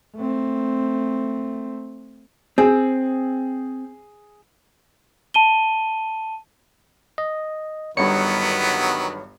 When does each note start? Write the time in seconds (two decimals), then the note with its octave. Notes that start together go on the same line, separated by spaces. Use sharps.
0.16 A3 C4
2.58 C4 G#4
5.34 A5 D#7 G7
7.18 D#5
7.97 G1 G2 D#3 F#3 B3 C#5 C#7